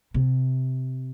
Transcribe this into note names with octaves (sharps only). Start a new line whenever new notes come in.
C3